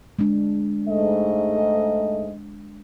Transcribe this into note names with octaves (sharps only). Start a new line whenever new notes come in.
G#3 D4
G#2 A3 D#5